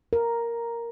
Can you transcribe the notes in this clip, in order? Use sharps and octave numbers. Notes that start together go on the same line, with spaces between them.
A#4